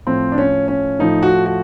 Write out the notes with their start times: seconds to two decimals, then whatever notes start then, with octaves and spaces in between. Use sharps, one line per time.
0.06 A2 F3 A3 C4
0.32 D4
0.38 C#4
0.68 C#4
0.99 A2 F3 A3 D#4
1.23 F#4
1.46 F#4